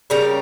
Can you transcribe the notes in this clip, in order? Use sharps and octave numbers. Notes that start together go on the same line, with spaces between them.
C#3 G3 A#3 C#4 A#5